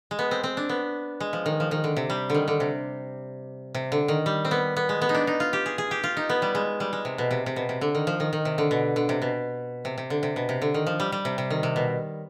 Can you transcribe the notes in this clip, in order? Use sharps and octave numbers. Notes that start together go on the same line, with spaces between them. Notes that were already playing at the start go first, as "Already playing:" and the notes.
G#3
B3
C4
C4
D4
B3
G#3
F3
D#3
F3
D#3
D3
C3
G3
D3 D#3
D3
C3
C3
D3
D#3
G3
C4
B3
B3
G#3
B3
D#4
D4
D#4
F4
G4
G#4
G#4
G4
F4
D#4
B3
G3
G#3
G3
G#3
C3
B2
C3
C3
B2
C3
D3
D#3
F3
D#3
D#3
C3
D3
B2
D3
C3
B2
C3
C3
D3
C3
B2
C3
D3
D#3
F3
G3
G3
C3
C3
D#3
C3
B2